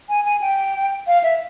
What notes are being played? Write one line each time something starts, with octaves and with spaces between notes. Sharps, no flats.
G#5
G#5
G5
F5
E5